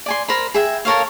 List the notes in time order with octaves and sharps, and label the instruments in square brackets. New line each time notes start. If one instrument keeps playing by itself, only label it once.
[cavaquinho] D5 G#5 C6
A#4 C5 B5
G#4 E5 G5
A4 A#4 C#5 F5